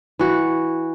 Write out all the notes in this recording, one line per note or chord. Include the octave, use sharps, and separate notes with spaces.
E3 F#4